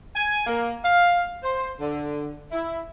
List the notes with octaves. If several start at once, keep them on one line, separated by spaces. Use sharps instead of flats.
G#5
A#3
F5
C5
D3
E4